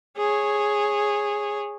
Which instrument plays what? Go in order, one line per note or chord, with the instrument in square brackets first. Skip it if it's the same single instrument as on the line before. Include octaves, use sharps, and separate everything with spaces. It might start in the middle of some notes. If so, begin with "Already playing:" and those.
[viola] G#4 C#5